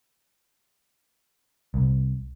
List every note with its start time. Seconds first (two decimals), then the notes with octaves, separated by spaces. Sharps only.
1.74 C2